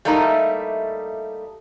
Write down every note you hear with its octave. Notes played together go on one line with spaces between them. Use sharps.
G3 A3 A#3 D#4 E4